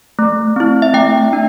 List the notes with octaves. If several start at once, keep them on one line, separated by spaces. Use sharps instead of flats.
A3
C4 E4
E5
A3 G5
D4